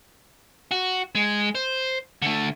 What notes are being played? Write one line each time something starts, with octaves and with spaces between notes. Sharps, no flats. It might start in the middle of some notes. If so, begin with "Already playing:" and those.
F#4
G#3
C5
D3 A3